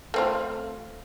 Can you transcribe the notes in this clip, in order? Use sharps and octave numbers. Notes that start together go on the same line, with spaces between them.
A3 C4 F4